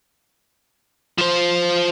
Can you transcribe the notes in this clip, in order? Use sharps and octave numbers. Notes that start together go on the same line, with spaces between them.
F3 C5